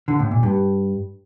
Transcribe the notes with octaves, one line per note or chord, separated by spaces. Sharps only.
D3
A2
A#2
G2